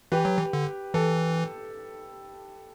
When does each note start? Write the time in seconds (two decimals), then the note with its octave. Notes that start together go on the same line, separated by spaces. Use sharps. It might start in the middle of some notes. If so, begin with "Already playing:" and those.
0.12 E3 G4 B4
0.25 F#3
0.39 E3
0.53 D3
0.94 E3 A4